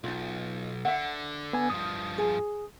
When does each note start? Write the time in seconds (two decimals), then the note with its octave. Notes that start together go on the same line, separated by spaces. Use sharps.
0.04 B1 D#4 F4
0.85 D3 E5 F#5
1.53 B3 G#5
1.70 G2 F3 D#6
2.18 G#4